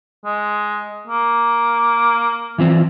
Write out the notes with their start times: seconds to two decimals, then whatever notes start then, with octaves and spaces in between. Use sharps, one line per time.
0.25 G#3
1.07 A#3
2.58 E3 F3 C4